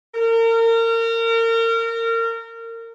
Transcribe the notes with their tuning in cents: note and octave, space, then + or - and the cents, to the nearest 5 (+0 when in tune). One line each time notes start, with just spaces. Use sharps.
A#4 -30